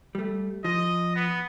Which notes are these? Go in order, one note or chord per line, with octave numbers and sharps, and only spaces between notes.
G3 A3
F3 D#5
B3